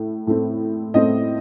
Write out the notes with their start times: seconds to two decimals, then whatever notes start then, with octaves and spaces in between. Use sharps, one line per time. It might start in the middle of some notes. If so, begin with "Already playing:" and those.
Already playing: A2 A3
0.27 A2 A3 C4
0.94 A2 A3 C4 D#5